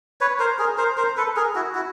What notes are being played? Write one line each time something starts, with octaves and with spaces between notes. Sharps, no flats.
B4 C#5
A#4 C5
G#4 A#4
A#4 C5
A#4 C5
A4 B4
G#4 A#4
E4 F#4
E4 F#4